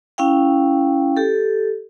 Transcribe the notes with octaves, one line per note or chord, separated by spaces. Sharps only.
C#4 E4 F5 G5
G4 A4